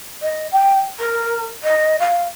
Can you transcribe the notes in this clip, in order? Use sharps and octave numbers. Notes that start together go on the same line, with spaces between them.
D#5
G5
A#4
D#5
F5